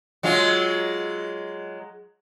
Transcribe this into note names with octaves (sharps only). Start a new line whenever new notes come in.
F#3 G#3 F4